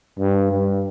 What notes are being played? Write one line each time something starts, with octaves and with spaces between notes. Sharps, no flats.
G2
G2